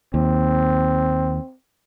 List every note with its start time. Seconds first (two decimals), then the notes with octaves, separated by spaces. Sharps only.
0.14 D#2 C4